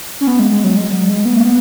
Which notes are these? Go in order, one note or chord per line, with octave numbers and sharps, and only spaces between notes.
C#4
B3
G#3
G#3
F#3
G#3
F#3
G#3
B3
A#3
B3